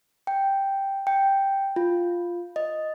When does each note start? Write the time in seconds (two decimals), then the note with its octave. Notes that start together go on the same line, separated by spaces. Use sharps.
0.27 G5
1.07 G5
1.76 F4
2.56 D#5